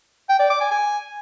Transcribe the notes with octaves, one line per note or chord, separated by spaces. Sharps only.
G5
D5
D6
G#5
G#5